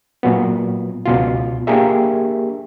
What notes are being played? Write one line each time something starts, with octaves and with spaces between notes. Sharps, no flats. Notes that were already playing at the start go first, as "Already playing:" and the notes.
A#2 F#3 B3
C#2 B2 F4
A#3 D4 G4 G#4 A#4 E5